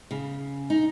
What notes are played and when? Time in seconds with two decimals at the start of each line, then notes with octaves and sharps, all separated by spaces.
0.11 C#3
0.70 D#4